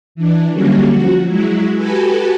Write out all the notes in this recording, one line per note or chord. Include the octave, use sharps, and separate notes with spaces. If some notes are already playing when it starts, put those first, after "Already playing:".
E3 D4
D3 F#3 G3 A#3 C#4
F3 F#4
F#3 G#3 E4
F#4 G4 A4 B4 G#5